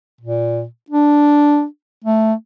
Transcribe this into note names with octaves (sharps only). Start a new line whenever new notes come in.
A#2
D4
A3